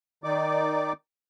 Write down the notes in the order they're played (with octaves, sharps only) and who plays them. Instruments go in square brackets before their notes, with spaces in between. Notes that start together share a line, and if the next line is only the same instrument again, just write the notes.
[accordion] D#3 D#4 D5 D6